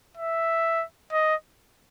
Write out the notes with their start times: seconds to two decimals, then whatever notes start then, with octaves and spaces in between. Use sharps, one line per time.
0.17 E5
1.13 D#5